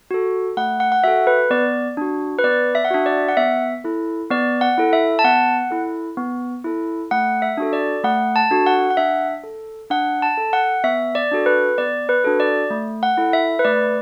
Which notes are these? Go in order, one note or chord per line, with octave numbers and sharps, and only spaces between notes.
F#4 A4
A3 F#5
F#5
F#5
F#4 A4 E5
B4
B3 D5
D4 F#4
B4
B3 D5
E5
F#5
D4 F#4 E5
D5
F#5
B3 E5
E4 A4
B3 D5
F#5
E4 A4
E5
A5
B3 F#5
E4 A4
B3
E4 A4
A3 F#5
E5
D4 F#4 A4
D5
A3 F#5
A5
D4 F#4 A4
F#5
F#5
D4 E5
A4
D4 F#5
A5
A4
F#5
B3 E5
D5
D4 F#4 A4
B4
B3 D5
B4
D4 F#4 A4
D5
A3
F#5
E4 A4
E5
B4
A3 D5